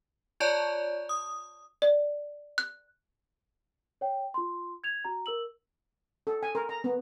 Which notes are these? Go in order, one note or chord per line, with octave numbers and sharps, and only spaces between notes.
F4 C#5 D5 A5 C#6
D#6
D5
F#6
C#5 G5
F4 C6
G#6 F7
F#4 A#5
A#4 E6 F#7
A4
G#5
A#4
A#5
B3